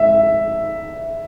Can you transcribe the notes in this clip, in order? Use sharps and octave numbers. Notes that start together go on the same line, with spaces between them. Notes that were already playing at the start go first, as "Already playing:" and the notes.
Already playing: E5